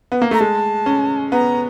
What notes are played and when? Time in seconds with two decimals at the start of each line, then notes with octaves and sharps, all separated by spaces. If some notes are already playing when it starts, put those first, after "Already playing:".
0.12 B3
0.22 A#3
0.31 A3 A#5
0.40 G#3 A5
0.86 C#4
1.32 B3 A#5